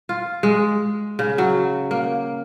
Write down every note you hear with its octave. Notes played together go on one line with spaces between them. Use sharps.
F4
G#3
C#3
F#3
A#3